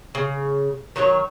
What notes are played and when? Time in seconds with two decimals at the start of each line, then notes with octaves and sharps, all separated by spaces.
0.15 C#3
0.96 D#3 F#3 G4 C#5